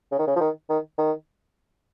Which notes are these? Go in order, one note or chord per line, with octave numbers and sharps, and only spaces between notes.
C#3
D#3
C#3
F3
D#3
D#3
D#3